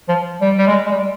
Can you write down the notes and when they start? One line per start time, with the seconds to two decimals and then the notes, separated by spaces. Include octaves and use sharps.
0.09 F3
0.41 G3
0.58 G3
0.67 G#3
0.86 G#3
0.91 G3